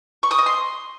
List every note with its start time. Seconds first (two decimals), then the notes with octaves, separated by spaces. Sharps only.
0.23 C#6
0.31 D#6
0.39 D#5
0.46 C6